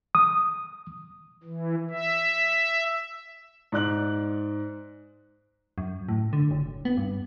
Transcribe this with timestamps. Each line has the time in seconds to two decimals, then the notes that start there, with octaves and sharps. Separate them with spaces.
0.15 D#6
1.44 E3
1.90 E5
3.72 G#2 D5 F#6 F#7
5.78 F#2
6.09 A2
6.33 D3
6.51 F#1
6.85 B3
6.97 G2